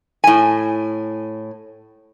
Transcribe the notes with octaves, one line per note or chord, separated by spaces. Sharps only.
A2 G#5